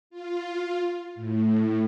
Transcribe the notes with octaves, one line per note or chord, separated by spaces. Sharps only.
F4
A2